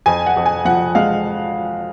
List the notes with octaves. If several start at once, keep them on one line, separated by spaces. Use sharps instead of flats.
F2 G#5
F#5
F2
G#5
F3 F#5
G#3 F5